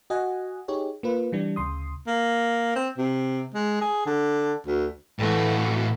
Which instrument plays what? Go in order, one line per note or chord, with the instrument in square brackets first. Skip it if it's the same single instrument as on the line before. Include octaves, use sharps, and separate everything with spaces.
[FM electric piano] F#4 D#5 F#5 G#5
D#4 G4 G#4 C#5
A#3 F4 B4
E3 G3 D4
D2 C#3 C6 D#6
[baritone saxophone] A#3
C4
C3
G#3
G#4
D3
D2
[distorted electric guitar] A2 F#4 [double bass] E3 A3